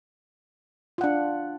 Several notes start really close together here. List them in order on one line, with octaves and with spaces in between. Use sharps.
F4 F#5 D4